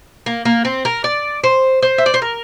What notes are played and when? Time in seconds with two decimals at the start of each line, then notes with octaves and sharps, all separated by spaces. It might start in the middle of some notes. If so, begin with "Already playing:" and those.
0.26 A#3
0.45 A#3
0.65 C4
0.85 A#4
1.04 D5
1.44 C5
1.82 C5
1.98 E5
2.06 D5
2.14 C5
2.22 A#4